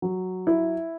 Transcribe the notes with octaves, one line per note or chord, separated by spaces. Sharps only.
F#3
E4